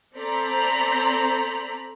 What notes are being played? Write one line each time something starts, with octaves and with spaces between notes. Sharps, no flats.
C4 A4 C5 D5 A#5 B5